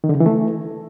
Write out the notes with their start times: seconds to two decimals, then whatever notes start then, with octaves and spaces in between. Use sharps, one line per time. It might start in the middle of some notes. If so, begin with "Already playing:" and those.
0.04 D#3
0.09 D3
0.15 C#3
0.20 E3
0.26 A3